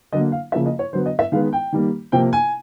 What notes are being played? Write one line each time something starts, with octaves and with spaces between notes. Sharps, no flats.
D3 F#3 A#3 D#5
F5
C#3 F3 A#3 E5
D#5
C#5
D3 F#3 B3 C5
D#5
E5
D#3 G#3 B3 F5
G5
D#3 G3 A#3
C3 F3 A#3 G5
G#5